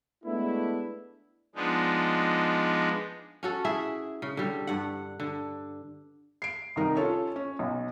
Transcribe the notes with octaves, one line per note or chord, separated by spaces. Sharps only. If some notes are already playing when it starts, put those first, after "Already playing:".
G#3 A3 B3 D4 E4
F3 G#3 B3 D4 D#4
C#4 F#4 A4
E4 G#4 E5
C#3
D3 G3
G2 F#5
D3
C7 D7
C2 D#3 D#4 A#4
C#4 F4 A4 C#5
C#4
B1